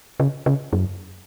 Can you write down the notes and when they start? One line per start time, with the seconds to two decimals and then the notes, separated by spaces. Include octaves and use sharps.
0.20 C#3
0.46 C#3
0.73 F#2